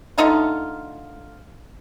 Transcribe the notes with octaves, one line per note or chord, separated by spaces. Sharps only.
D3 A3 D#4 F4